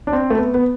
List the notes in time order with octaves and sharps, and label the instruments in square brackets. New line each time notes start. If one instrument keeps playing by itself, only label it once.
[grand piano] D4
C4
A3
B3
B3